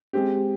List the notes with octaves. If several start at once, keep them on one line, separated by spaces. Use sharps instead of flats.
G#3 C4 G4